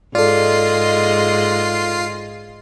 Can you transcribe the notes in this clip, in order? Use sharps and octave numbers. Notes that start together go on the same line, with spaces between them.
G#2 F4 G#4 A4 D5 D#5 C7